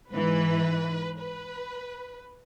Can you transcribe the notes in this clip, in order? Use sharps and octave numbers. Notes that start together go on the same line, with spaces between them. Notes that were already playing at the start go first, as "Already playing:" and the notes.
G#2 E3 B4
B4